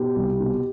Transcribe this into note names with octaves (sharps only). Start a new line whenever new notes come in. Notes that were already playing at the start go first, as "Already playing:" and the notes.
Already playing: B2 G4
C2
B2